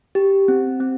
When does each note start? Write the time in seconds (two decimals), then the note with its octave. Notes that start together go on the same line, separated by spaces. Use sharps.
0.15 G4
0.48 C4
0.80 C4